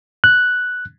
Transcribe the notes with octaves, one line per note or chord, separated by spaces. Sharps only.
F#6